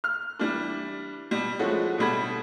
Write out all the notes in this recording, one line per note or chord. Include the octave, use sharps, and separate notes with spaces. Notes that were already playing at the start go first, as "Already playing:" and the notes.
F6
E3 G3 D4
B2 G3
F3 G#3 A3 C#4 E4 F#4
B2 D3 G3 B5 G#6